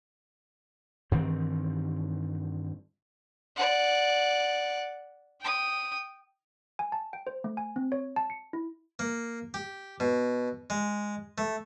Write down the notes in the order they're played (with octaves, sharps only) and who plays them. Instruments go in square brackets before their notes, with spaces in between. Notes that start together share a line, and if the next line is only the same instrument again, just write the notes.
[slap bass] G2 D#3 E3 C4
[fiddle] D5 F#5
G5 D#6
[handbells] G#5
A5
G5
C5
A3
G#5
C4
C#5
A5
C#7
E4
[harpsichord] A#3
G4
B2
G#3
A3